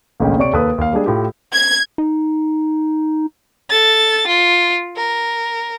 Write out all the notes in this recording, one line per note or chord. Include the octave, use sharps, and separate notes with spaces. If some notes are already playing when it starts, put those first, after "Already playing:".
A1 D2 A#2 G#3 C#4 G5
C3 C#5 D5 C#6 D7
D#2 A4 B4 D#6
D#2 F5
G3 G#3 D4 G#4
A2 F4 G4
G#6
D#4
A4 A6
F4
A#4